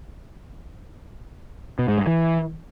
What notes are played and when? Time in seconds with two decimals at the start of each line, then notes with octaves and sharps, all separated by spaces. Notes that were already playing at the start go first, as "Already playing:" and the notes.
1.79 B2
1.88 G#2
1.98 G2
2.07 E3